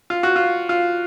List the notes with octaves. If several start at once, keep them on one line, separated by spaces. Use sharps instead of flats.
F4
F#4
F4
F4